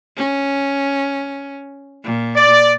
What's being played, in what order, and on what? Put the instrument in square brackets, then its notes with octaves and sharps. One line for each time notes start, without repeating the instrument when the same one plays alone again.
[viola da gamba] C#4
A#2
[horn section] D5